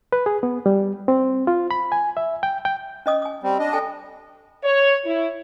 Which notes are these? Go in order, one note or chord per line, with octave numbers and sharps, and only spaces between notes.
B4
G#4
B3
G3
C4
F4
B5
G#5
E5
G5
G5
C#4 D#5 D#6
G#5 D#6
G3 C4
D4 D#5
A4 G5 G#5
C#5
E4